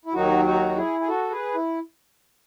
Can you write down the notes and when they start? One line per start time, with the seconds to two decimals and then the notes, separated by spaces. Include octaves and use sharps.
0.05 E4
0.13 D#2 D#3 F#3 D#4 F#4
0.44 D#4 F#4
0.76 E4 G#4
1.00 G#4
1.08 F#4 A4
1.30 G#4 B4
1.55 E4